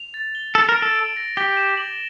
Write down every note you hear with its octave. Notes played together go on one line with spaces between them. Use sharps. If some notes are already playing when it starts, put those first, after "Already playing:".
Already playing: F7
A6
G7
A4 F#7
A#4
D7
A4
D7
A#6
G4 G7
E7
F#7